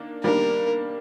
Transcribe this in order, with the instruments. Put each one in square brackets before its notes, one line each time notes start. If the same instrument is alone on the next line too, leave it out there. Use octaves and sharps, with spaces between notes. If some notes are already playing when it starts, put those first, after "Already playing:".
Already playing: [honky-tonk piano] D#3 A#3 D4
[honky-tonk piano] D#3 G3 A#3 D4 [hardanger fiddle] A#4